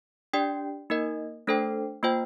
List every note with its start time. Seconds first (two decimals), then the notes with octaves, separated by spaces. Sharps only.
0.33 D4 G4 D5 G5
0.90 A#3 D#4 A#4 D#5
1.47 A3 D4 A4 C5 G5
2.03 A#3 F4 C5 G5